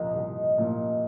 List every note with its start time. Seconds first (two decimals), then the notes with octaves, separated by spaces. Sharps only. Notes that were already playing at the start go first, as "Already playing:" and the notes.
Already playing: C2 A#2 F3 A#3 D#5
0.15 C2
0.58 A#2 F3 A#3